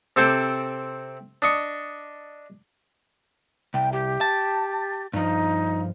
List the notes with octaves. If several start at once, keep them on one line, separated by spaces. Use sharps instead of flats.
C3 C4 A4 C5 G5 D6
D4 D#5 C#6
C2 G5
G4
A5
G2 F3 D#4